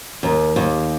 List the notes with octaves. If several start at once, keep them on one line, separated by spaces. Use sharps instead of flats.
D#2
D#2